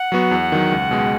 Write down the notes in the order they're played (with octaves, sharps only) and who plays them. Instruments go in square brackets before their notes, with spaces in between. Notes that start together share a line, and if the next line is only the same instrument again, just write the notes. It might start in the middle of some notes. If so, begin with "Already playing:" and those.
Already playing: [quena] F#5
[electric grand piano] F#3 B3 F#4
E2
D#3 F#3
C#2
B2 G#3